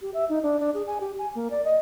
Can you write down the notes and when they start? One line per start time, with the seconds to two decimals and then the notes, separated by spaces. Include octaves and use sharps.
0.02 G4
0.14 E5
0.29 D#4
0.43 D4
0.60 D4
0.74 G#4
0.87 G#5
1.00 G4
1.18 G#5
1.35 A#3
1.50 D5
1.65 D#5